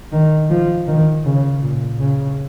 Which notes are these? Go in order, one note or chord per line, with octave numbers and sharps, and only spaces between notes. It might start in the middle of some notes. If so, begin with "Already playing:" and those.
D#3
F3
D#3
C#3
A#2
C#3